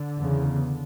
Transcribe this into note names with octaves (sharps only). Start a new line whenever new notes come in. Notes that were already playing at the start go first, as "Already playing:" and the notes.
Already playing: D3
E2 C#3